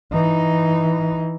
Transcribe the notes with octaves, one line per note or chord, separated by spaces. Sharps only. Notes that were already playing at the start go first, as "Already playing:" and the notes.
E3 D#4